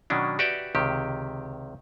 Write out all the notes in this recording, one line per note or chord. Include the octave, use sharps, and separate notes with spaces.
B2 D#3 F#3 C#4 D4
F#4 G4 B4 D5 E5 G5
C#2 C3 D#3 G4